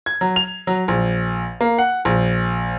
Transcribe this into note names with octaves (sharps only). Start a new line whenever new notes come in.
G#6
F#3
F7
F#3
A#1
A#3
F#5
A#1